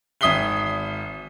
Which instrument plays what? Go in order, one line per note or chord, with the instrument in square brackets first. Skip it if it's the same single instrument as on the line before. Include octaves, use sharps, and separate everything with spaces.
[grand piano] G#1 E5 D#6 B6 C7 G7